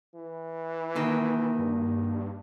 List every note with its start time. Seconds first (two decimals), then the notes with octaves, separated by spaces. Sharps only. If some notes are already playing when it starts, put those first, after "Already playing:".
0.15 E3
0.95 B2 D#3 A#3
1.59 G2